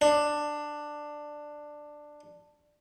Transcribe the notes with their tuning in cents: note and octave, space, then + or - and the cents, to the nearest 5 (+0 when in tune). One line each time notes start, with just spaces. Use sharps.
D4 +10